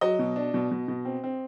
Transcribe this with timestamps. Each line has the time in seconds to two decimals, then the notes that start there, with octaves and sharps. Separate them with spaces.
0.01 F#3 D#5
0.19 B2
0.36 D4
0.54 B2
0.71 B2
0.88 B2
1.05 C4
1.24 C4